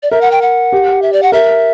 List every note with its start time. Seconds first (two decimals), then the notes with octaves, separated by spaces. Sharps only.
0.03 D5
0.11 A#4 E5
0.21 F#5
0.31 G5
0.42 F#5
0.73 G4
1.02 E5
1.13 D5
1.23 F#5
1.32 A#4 E5